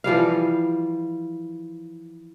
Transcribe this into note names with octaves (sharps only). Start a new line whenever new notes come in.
E3 F3 G3 F5